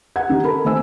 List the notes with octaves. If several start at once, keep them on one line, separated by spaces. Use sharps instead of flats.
F#5 G#6
D#3 D#4 G4
A4 A#4 B5
D#3 A3 C4 G#5 E6